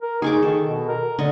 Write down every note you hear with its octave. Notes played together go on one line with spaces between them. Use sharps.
A#4
D#4 G#4 C#6 D6
D#3 A4
B2
A#4
D3 D#5 C#6